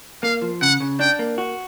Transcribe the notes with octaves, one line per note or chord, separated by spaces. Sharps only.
A#3 F5
F3
C#3 F#5
C#3
D4 G5
A#3
F#4